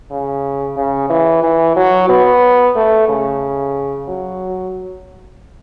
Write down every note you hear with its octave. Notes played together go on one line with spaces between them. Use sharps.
C#3
C#3
E3
E3
F#3
B3
A3
C#3
F#3